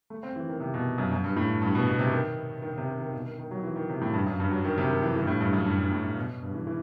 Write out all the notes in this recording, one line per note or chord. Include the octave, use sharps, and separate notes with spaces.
A3
C4
E3
D#3
C3
B2
F#2
F#2
G2
A2
G2
B2
B2
C3
D#3
D#3
C3
D#3
D#3
B2
D#3
D#3
F#3
E3
D#3
C3
A2
G2
F#2
G2
F#3
D#3
C3
D#3
E3
E3
G2
A2
G2
F#2
G2
G2
A2
A2
B2
G2
E3
E3